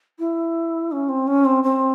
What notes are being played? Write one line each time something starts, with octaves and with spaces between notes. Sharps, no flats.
E4
C#4
C4
C#4
C4
C4